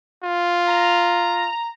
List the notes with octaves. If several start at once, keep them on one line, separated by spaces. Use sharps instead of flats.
F4
A#5